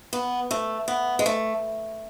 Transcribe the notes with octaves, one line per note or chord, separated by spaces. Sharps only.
B3
A3
B3
G#3
A3